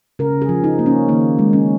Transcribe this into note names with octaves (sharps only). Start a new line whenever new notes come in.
C#3 A#4
G#4
F3
D#4
A#3
C#4
D#3 A#3
G#3
C#4